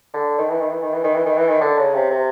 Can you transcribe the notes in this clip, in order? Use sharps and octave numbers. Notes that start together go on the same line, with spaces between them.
D3
D#3
E3
D#3
E3
D#3
E3
D#3
E3
D#3
E3
D#3
D3
C#3
C3
C3